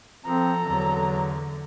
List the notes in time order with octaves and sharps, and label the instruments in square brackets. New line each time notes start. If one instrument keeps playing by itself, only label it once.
[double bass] F3 [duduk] C4 [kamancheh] A4 A#5
[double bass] E2 D3 [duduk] F#3